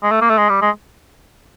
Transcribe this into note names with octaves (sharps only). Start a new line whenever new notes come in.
G#3
A3
A#3
A3
G#3
G3
G#3